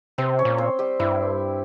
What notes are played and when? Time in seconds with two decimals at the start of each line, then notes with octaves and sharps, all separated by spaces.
0.18 C3 C4 C5
0.39 C#4 C#5
0.45 A#2
0.58 C4 C5
0.79 G3 G4
0.99 G2 E4